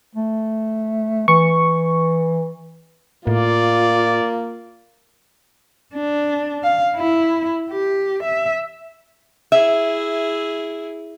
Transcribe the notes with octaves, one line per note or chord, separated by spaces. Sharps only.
A3
E3 C#6
A2 A#3 F4 D5
D4
F5
E4
G4
E5
E4 G#4 E5